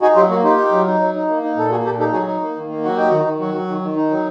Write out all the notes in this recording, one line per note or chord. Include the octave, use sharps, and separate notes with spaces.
D#4 F#4 G#4
F#3 F4 G4
A#3 F#4
D#4 F4 G4
D#4
F#3
D#4
F#3
D#4
A#3
D#4
A#2 A4
A#3 F#4 G#4
A#2 G4 A4
D#4 G4 A4
F#3 F#4 G#4
D#4
A#3
D#3
A#3
F#3 F#4
D#4 G4
D#3 F#4
D#3
F#3 F#4
F#3
D#3
D#3
D#4
F#3